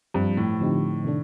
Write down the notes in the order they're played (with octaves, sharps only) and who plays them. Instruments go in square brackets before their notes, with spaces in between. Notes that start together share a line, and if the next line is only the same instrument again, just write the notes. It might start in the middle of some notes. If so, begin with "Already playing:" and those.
[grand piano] G2 [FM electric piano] F3 C4 G4
[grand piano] A2
[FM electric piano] D3 F3 C4 D#4 G4
C3 D#3 A3 D4